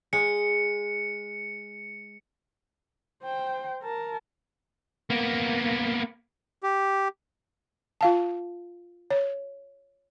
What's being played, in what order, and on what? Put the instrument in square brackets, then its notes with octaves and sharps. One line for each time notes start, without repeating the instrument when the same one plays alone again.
[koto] G#3 [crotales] C#7
[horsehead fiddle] C5 G5
A#4 A5
[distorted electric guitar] A#3 B3
[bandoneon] G4
[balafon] F4 F5 A5
C#5